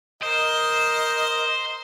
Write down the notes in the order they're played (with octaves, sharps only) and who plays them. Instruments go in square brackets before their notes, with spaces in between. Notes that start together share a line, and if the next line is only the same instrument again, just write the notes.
[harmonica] A#4 D#5 [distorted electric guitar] C5